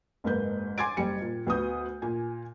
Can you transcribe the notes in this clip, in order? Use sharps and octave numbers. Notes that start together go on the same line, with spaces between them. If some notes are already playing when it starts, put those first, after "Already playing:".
F#1 G#2 A#3 B4 G6
G#5 C6 D6 G#6 A6 D7
F#1 G3 C#7
A#2
D2 B3 F#4 D#6 G6
A#2 G#5